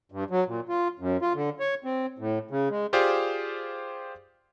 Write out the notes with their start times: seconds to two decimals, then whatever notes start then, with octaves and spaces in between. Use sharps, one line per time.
0.12 G2
0.30 F#3
0.47 A#2
0.69 F4
0.99 F#2
1.22 F4
1.34 D3
1.60 C#5
1.84 C4
2.18 A2
2.51 C#3
2.70 G#3
2.93 F4 G4 G#4 C5 D5 F5